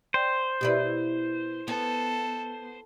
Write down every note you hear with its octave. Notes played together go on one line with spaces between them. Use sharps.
C5 D5 G5
B2 E4 G4 B4 D5
B3 A4